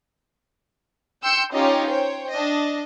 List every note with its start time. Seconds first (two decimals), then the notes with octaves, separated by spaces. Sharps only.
1.23 G5 C6 E6 G6 C#7
1.54 C#4 D#4 F4 G4 C#5 D#5
1.90 C5 C#5 G5
2.30 D4 D#5